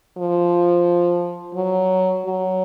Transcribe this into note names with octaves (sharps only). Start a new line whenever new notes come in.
F3
F#3
F#3